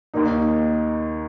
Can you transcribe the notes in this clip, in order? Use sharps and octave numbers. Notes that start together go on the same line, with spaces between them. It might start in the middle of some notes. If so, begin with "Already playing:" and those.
D#2 D#3 A#3 D#4